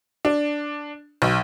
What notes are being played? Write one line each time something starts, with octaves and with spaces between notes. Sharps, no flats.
D4
B1